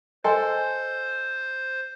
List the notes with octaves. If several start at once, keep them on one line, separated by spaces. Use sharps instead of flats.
A4 C5 D#5 G#5 C6